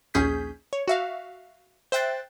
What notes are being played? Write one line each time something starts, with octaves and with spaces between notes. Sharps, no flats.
A#1 D#2 C#4 G#4 G6 B6
C#5
F#4 E5 F5
C5 E5 G5 F#6 A6